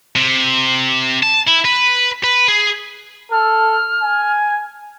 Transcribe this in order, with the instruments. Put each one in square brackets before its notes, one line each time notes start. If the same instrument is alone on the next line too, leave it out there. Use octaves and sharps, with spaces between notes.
[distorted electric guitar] C3
A5
E4
B4
B4
G#4
[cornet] A4 [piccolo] F6
[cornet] G#5